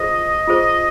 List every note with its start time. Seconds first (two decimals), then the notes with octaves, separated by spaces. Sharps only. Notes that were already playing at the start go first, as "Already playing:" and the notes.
Already playing: F4 G#4 C5 D#5
0.47 F4 G#4 C5